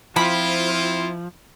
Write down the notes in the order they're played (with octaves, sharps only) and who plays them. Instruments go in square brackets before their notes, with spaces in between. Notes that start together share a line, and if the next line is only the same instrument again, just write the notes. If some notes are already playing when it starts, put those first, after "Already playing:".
[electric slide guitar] F3 [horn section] C4 F4 [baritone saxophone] E4 [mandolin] B5